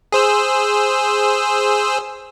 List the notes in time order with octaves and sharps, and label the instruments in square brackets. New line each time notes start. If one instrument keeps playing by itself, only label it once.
[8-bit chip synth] G#4 C5 E6